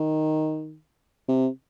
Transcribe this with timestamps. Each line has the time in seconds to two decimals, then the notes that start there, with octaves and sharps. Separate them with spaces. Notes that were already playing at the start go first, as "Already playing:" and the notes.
Already playing: D#3
1.28 C3